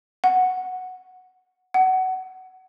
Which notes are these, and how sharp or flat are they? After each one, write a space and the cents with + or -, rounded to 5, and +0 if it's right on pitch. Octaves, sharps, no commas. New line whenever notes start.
F#5 +0
F#5 +20